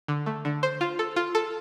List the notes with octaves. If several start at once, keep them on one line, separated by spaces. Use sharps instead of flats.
D3
A3
D3
C5
F4
A4
F4
A4